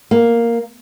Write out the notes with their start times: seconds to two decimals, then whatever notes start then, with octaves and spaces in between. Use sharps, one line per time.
0.11 A#3